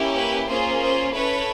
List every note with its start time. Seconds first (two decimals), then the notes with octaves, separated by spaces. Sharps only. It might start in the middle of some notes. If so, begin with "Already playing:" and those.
Already playing: A#3 C#4 E4 G4
0.15 B4
0.48 A#3 C#4 F4 G#4 C5
0.81 C5
1.14 C#4 E4 A4 B4 C#5